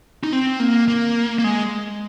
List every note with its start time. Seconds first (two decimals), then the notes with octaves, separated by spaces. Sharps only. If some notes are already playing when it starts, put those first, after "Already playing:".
0.24 D#4
0.32 C4
0.60 A#3
0.88 A#3
1.39 A#3
1.44 G#3